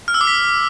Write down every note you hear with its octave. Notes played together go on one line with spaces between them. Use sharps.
F6
E6
D6
B6